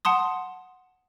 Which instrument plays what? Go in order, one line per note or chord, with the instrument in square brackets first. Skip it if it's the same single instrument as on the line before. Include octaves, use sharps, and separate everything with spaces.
[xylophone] F#5 A5 C6 D#6